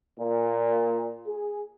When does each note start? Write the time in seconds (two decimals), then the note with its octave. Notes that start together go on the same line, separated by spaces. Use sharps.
0.19 A#2
1.27 G#4